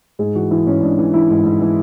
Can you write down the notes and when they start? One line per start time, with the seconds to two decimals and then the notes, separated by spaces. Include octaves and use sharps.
0.19 G#2 G#4
0.35 E3 F#4
0.51 E3 E4
0.66 G#2 C#4
0.82 G#2 D4
0.99 E3
1.14 E3 E4
1.30 G#2
1.45 G#2
1.61 E3